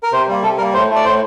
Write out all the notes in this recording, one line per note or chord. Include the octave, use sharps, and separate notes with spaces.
A#4
C3 C5
G3 A#3
C3 A4
G3 A#3 A#4
A2 C5
A3
D5
A2 C5